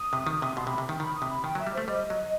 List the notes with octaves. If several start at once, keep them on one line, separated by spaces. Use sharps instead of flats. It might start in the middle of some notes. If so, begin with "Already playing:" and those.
Already playing: D#6
C3
D#3
C3
B2 C6
C3 B5
C3
D#3 G5
D#3 B5
D#6
C3
B5
D#3 G5
F#3
E5
G3
A3 C5
G3 D#5
F#3